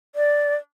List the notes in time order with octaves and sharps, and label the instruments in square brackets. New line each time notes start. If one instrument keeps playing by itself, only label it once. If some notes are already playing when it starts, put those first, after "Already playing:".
[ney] D5